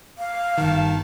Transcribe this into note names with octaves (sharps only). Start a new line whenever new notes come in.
F5
G1 D#3 A5